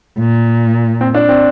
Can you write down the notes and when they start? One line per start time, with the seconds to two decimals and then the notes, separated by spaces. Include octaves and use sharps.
0.18 A#2
1.01 C4
1.15 D4
1.29 C4